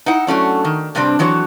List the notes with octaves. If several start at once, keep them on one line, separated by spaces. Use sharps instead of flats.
D#4 E4 F#5
F#3 A3 C#4 D4
D#3
G2 C3 G3 C4 D4
F2 E3 F#3 F#4 C#5